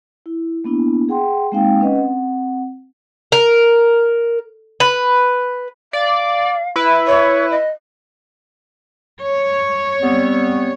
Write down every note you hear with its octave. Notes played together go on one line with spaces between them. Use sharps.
E4
A#3 B3 D4 E4
G#4 F#5 G5 C6
G#3 A#3 C4 D#4 F5 G5
C#4 B4 D#5 F#5
C4 F#5
A#4
B4
D5 F5
E4 B4
C#5
D#5
C#5
G3 B3 C4